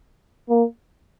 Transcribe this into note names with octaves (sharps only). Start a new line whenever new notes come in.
A#3